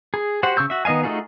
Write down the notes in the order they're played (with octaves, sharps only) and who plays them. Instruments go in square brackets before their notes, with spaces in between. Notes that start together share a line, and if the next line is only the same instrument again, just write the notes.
[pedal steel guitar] G#4
F#4 G4 C5 F#5
C#3 C#6 E6 G6
F#4 E5
D#3 B3 D#5 F5 G#5
A3 D#4 F4 F#4 G#4